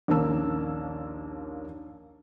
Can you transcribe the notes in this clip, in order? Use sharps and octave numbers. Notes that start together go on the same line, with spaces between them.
A#1 D#2 A#3 C#4 A5 E6